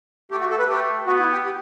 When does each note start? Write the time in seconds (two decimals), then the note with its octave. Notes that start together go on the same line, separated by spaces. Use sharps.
0.31 A3 G4
0.40 F#4
0.50 A4
0.59 B4
0.68 A3 G4
1.07 B3 F#4
1.20 E4
1.32 G4
1.45 G4